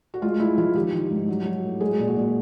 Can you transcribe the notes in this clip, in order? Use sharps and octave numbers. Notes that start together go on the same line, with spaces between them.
F#4
G#3 F4
G#3 E4
F3 F4
D#3 G4
D#3
G#2
F#3
F#3
A2
G#3 G#4
A#2
F#4
A#2